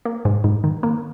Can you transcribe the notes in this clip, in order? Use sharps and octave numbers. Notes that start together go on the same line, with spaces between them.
A#3
G#2
G#2
D#3
A#3